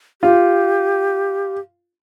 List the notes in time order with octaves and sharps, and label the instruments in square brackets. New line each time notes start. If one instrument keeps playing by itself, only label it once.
[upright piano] F4 [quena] G4